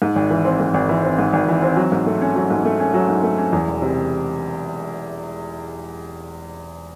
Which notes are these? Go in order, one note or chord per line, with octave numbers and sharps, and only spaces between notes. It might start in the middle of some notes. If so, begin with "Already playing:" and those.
G#2
G#1
E3
C4
G#2
G#1
E3
C4
G#2
G#1
E3
C4
F#3
G#2
A3
C#4
F#3
G#2
A3
C#4
F#3
G#2
A3
C#4
E2
E1
C3